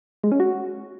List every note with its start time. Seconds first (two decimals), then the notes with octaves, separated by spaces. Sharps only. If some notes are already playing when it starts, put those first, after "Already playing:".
0.24 G#3
0.32 C#4
0.40 F#4